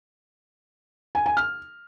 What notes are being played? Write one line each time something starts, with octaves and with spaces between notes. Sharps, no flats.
G#5
G#5
F6